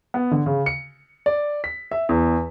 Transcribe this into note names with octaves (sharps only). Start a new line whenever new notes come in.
B3
D3
C#3
C#7
D5
B6
E5
E2